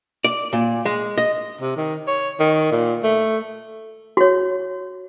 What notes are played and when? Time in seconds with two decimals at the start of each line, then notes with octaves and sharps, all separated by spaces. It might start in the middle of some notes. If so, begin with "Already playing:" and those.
0.25 D5
0.53 A#2
0.85 G#3
1.18 D#5
1.61 C3
1.77 D#3
2.07 C#5
2.40 D#3
2.72 A#2
3.04 A3
4.17 F#4 C#5